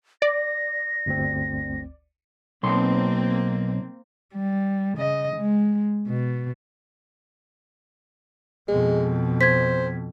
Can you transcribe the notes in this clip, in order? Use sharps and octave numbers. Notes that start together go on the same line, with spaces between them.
D5 A#6
G1 D2 C4
B1 A#3 C4 C6
G3
C#3 D#5
G#3
B2
F2 B2 G#3
C5 G#6 B6